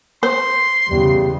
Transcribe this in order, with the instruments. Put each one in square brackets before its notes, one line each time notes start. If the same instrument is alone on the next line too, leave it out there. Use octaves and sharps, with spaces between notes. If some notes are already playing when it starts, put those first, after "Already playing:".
[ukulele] C5 [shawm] C6
[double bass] E2 C#3 [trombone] G3